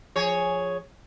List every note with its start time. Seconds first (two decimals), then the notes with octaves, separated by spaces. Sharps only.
0.16 F3 G#4 C#5